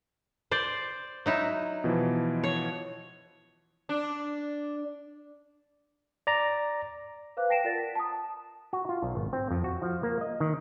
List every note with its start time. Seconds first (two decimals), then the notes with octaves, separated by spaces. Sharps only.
0.51 C5 D5
1.26 F#3 D#4 E4
1.84 B2 E3 F3
2.44 C#5
3.89 D4
6.27 D5 A#5
7.37 B4 C5 F5 D6 F#6
7.49 G5 A5 A#6 C7 D7 E7
7.64 F4 A#4 D5 F#5 A6
7.78 B6
7.95 A5 A#5 D#6
8.73 F#4
8.89 F4
9.03 B1
9.15 G#1
9.33 C4
9.51 F2
9.64 F#4
9.82 F3
10.03 A#3
10.21 D#5
10.40 D#3